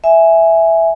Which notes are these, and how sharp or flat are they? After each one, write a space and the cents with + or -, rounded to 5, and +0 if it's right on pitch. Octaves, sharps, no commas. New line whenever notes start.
E5 +0 G#5 +0